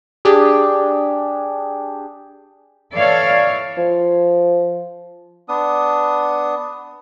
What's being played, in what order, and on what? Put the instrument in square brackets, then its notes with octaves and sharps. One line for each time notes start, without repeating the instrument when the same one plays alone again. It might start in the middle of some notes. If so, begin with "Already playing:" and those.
[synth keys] D4 G4 G#4
[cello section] E3 A4 C#5 D5 F5
[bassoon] F3
[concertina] B3 D4 D#6